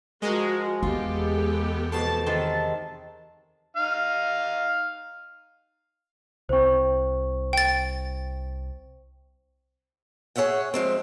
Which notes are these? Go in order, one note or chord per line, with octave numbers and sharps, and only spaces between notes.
F3 G#3 F#4 A#4 D#5 G#5 A#5
E2 B3 F4 G4 A4
F2 B2 A5
C3 D#3 G#3
D#4 F5
C2 C4 C5 C#6
G5 A6
G#4 C#5 E5 F#5 G5
F3 G#3 C4